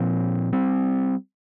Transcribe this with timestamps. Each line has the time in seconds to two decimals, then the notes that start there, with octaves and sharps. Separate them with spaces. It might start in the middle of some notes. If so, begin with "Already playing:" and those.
Already playing: A#2 F3 C4
0.52 G3 C4